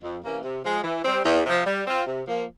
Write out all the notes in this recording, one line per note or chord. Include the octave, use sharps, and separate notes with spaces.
F2
C3 E3 A#3 C#4
C3
F3 G#3
E3
G3 C4
E2
C3 F3
G3
C4 F4
C3
F3 A#3